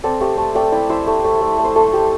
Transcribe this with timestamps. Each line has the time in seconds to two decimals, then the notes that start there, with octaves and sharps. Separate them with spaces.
0.04 C4 A4 D5
0.21 A3 G4 C5
0.38 A3
0.55 A3 D5 G5
0.72 E4 D5 G5
0.89 E4 C5 E5
1.07 A3
1.24 A3
1.41 A3
1.58 A3
1.64 C5
1.76 A3 A4
1.92 A3 G4